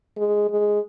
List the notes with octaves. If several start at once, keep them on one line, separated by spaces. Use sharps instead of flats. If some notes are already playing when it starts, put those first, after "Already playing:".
G#3
G#3